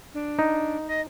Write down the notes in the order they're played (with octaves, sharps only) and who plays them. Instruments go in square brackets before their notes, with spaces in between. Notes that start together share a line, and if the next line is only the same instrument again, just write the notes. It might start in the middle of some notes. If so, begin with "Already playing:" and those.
[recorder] D4
[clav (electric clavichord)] D#4
[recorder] D#5